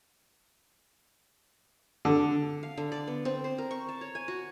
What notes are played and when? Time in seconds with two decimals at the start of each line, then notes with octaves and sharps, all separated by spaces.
2.05 D3
2.63 F5
2.77 D3
2.92 D5
3.07 B3
3.25 C4
3.44 C5
3.58 A#4
3.71 C#6
3.89 A5
4.01 C#5
4.15 G#5
4.28 F#4